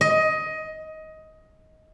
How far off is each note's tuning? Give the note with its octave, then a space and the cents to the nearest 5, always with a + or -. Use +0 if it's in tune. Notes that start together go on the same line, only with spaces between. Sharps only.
D#5 +15